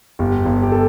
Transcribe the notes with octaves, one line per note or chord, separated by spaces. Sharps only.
G1 G4
G1
G4
A4